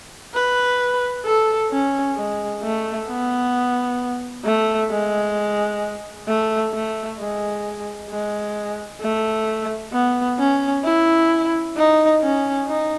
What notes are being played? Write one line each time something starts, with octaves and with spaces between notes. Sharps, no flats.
B4
A4
C#4
G#3
A3
B3
A3
G#3
A3
A3
G#3
G#3
A3
B3
C#4
E4
D#4
C#4
D#4